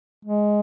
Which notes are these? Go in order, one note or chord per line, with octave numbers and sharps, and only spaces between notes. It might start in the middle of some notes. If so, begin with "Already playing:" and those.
G#3